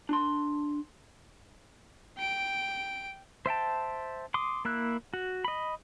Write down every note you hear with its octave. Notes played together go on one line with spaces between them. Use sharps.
D4 C6
G5 D7
C5 E5 G5 A5
C6 D6 D#6
A#3 E4 E6 F#6
F#4
D#5 B5